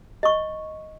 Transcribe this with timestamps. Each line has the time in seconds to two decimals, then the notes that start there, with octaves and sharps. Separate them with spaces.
0.23 D#5 C#6